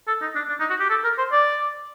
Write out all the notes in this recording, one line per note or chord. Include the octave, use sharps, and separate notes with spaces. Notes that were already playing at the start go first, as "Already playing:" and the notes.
A4
D#4
D4
D4
D#4
F#4
G4
A4
A#4
C5
D5